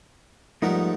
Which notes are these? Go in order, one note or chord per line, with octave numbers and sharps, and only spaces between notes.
G#2 F3 G3 A3 B3 D#4 A#4